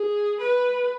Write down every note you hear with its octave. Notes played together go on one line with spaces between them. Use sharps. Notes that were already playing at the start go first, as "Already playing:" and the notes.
Already playing: G#4
B4